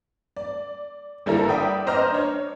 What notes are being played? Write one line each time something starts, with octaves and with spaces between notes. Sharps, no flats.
D5
G1 G3 A#3 E4 A4 A#5
D5 E5 G5 B5 D#6
B4 C5 D#5 A#5 D6 F6
D4 C#5